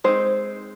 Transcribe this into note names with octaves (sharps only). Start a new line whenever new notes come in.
G#3 C4 D#4 C5